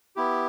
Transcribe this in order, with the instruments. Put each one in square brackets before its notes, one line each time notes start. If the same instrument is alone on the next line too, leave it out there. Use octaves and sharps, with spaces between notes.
[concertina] B3 E4 G4